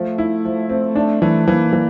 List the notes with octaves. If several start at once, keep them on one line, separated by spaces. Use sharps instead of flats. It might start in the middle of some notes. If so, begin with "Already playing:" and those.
Already playing: F3 A3
E4
F3
C4
A3 D4
E3 A3
E3 A#3
E3